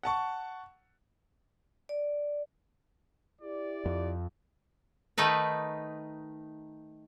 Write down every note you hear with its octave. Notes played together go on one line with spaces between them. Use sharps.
F#5 A5 C#6
D5
E4 G4 D5
F2
D#3 A3 D#4 B4